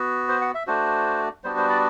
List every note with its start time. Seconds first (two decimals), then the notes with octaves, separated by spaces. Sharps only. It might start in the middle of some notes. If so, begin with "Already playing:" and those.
Already playing: B3 F#4
0.28 C5
0.41 F#5
0.54 E5
0.67 A3 D4 F#4 C5
1.44 G3 B3 D4 F#4 C5
1.57 C5
1.69 D5